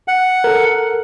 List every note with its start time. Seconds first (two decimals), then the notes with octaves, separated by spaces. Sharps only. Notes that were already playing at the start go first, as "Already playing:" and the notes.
0.08 F#5
0.44 A4 A#4